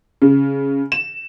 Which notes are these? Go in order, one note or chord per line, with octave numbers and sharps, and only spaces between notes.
C#3
E7